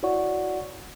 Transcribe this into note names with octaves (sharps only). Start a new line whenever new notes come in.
E4 F#4 C#5 D5 F#5 C#6